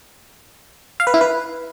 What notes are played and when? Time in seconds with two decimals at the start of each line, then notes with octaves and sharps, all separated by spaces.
1.00 F5
1.07 B4
1.14 E4
1.21 B4